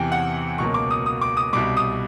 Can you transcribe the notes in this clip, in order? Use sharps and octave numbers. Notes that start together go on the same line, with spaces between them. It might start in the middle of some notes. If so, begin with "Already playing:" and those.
Already playing: E2 C3 E3 G5 G#5
F#5
C#2 B2 F#3 A#3 C#6
D6
D#6
D#6
D6
D#6
C2 B2 G3 D6
D#6